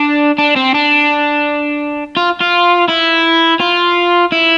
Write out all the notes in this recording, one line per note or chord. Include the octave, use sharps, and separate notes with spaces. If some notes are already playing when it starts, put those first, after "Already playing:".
Already playing: D4
D4
C4
D4
F4
F4
E4
F4
E4